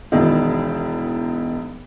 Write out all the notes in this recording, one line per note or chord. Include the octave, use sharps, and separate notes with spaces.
E1 E2 D#3